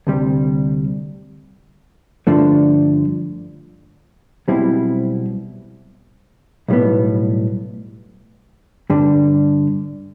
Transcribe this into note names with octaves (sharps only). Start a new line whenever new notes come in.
D2 C3 G3
G2 D3 F3 A3 D4
B1 B2 G3 C4 E4
B1 A2 G3 B3
G2 D3 G3 D4